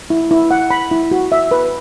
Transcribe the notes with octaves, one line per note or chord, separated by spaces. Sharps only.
E4
E4
F#5
B5
E4
F#4
E5
B4